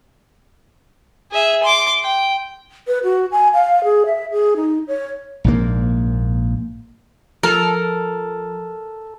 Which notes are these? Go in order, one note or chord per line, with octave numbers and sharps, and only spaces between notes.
G#4 E5
C6 D6
G5
B4
F#4
G#5
F5
G#4
E5
G#4
D#4
C#5
A#1 G#2 A#3
F3 A4 A#4